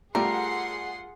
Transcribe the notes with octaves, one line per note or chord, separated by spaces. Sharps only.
G3 A3 F4 G4 G#4 A#4 F#5 C6